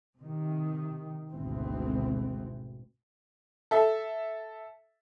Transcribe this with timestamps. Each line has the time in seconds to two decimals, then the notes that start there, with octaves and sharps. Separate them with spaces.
0.19 C3 D#3
1.31 G#1 D2 G#2 B2 E3 C4
3.71 A4 E5